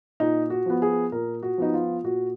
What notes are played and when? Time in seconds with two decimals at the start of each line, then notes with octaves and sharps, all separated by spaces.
0.20 A#2 D#4
0.50 F#4
0.66 F3 B3
0.82 G#4
1.12 A#2 A#4
1.43 F#4
1.58 F3 B3 D#4
1.74 F4
2.04 A#2 F#4